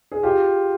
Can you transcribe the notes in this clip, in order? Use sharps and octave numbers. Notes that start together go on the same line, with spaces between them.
G#4
F4 G4